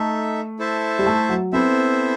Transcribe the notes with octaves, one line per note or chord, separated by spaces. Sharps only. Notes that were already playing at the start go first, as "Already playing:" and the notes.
Already playing: A3 D#4 A4 E5
E4 A4 C5 E5 A5
G3
A3
F#3
B3 C4 E4 A4 C5 E5